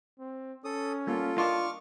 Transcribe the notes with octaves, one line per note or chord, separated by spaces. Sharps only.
C4
C#4 A4 D#6
G3 A#3 B3 F4 A4
D4 F4 A#4 D#5 A5 C#6 D6 F6